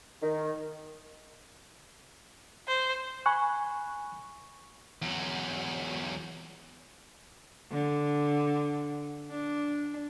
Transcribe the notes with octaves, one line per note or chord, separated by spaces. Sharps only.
D#3
C5
G#5 B5 C#6 F#6
E2 F#3
D3
D4